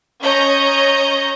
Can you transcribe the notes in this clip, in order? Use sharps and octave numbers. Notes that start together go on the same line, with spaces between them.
C#4 C#5 D#5 A#5 G6